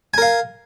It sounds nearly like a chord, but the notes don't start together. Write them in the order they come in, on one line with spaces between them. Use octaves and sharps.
G#5 A#4 F5